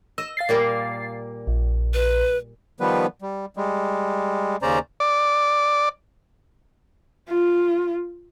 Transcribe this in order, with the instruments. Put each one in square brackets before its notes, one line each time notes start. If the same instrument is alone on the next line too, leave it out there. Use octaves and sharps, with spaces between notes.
[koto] D#5 [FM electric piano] E6
[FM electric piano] F5 A6 C7
[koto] A#2 G3 A#3
[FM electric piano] A#1
[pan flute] B4
[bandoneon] D#3 F3 G3 B3 B4
G3
G3 G#3
D#2 C#3 C#4 C5 D5 A#5
[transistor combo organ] D5
[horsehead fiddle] F4